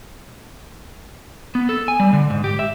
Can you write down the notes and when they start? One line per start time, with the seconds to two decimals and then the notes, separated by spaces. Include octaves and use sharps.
1.55 B3
1.69 A4
1.88 G#5
2.00 G3
2.13 D3
2.30 G#2
2.44 G4
2.59 E5